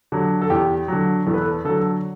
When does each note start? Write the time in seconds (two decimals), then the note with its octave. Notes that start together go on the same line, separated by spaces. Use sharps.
0.12 D3 F#3
0.42 A4
0.50 E2 G4
0.88 D3 F#3
1.27 E2 A4
1.34 B4
1.41 A4
1.65 D3 F#3 A4